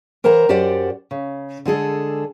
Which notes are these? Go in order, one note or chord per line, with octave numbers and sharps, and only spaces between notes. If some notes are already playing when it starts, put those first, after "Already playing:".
E3 A#4 C5 F#5 A#5
F#2 G4 C5 D5 F#5
C#3
D3 G#3 G#4 A4